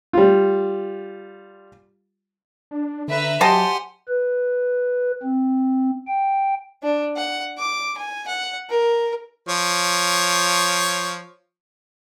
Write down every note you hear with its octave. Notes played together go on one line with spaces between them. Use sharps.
G3 F4
D4
D3 B4 E5 A#5
F#3 G4 C5 D#5 F#5 G#5 A5 C6
B4
C4
G5
D4
F#5
D6
G#5
F#5
A#4
F3 C#5